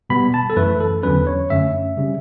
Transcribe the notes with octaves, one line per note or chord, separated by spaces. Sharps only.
B2 G3 B3 B5
A5
A4
F#2 E3 A3 B4
A4
E2 D3 F#3 C#4 B4
C#5
F#2 D3 A3 C#4 E5
C#3 G3 C#4